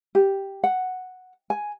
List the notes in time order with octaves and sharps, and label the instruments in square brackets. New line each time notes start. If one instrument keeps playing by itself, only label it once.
[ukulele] G4
F#5
G#5